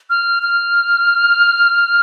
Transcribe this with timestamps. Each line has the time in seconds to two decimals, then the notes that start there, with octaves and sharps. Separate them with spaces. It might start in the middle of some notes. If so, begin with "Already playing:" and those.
0.10 F6
0.43 F6